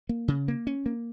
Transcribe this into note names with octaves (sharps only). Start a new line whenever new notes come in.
A#3
C#3
A#3
C#4
A#3